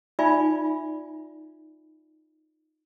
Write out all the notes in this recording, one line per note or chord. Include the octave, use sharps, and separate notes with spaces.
D#4 F4 D5 E5 G#5 B5